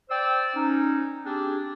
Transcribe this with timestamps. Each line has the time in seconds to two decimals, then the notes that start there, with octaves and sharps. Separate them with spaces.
0.10 C5 D5 G5 E6
0.56 C#4 D#4
1.26 C4 D4 G4 G#4